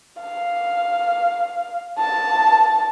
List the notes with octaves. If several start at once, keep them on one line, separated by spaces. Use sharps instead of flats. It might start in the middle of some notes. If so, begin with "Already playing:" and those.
F5
A5